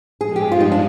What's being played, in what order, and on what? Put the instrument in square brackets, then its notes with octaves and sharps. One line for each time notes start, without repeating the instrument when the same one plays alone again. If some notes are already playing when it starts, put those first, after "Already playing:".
[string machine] G2 F3 G#3 [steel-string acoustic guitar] G#4
[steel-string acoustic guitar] G4
F4
D#4
D4